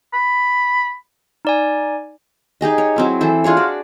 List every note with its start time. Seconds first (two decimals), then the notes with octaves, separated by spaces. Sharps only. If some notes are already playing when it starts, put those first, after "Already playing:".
0.14 B5
1.45 D#4 D5 G#5
2.61 D#4 G4 G#4 D#5
2.78 C#5
2.96 F#3 C4 E4
3.21 E3 A4 C5
3.44 D4 F4 G#4 C#5
3.57 F#4 D5